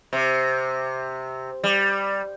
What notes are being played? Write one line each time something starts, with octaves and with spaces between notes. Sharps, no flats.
C3
G3